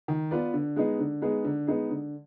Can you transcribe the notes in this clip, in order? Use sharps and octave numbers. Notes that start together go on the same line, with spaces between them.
D#3
B3 F4 B4 D5
D3
G#3 B3 D#4 G#4
D3
G#3 B3 D#4 G#4
D3
G#3 B3 D#4 G#4
D3